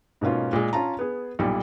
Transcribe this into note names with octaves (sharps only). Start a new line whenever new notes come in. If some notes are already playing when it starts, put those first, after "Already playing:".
G#2 B2 A#3 C#4 F4
A#2 G#3
C#4 F4 A5 A#5
B3 G#4
B1 A#2 G3